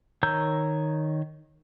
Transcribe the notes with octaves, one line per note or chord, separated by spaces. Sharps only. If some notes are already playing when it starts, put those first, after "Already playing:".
D#3 C#5 A#5 E6 G6